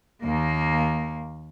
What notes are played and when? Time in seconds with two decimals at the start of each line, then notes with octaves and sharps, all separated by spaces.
0.23 D#2 A#3